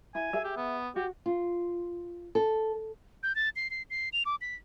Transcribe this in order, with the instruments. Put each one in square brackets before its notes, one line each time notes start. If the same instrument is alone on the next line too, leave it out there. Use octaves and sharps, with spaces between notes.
[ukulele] E4 [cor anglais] G#5
[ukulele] G#4 E5
[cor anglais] G4
B3
[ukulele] F#4 [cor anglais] G4
[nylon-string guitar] F4
A4
[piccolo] G6
A6
C7
C7
C7
F7
D6
B6